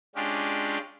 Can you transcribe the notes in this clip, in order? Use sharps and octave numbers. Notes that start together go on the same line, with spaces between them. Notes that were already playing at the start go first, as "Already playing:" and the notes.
G#3 C#4 D4 F4 G4